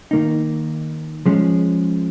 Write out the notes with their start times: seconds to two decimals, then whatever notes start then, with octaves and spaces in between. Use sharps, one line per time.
0.11 D#3 A#3 D#4
1.26 F3 G#3 C#4